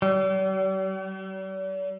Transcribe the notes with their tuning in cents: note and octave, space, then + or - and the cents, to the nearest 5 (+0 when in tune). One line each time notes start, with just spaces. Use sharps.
G3 -45